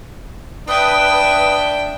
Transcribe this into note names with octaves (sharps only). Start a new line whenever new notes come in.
D4 B4 E5 G5 D#6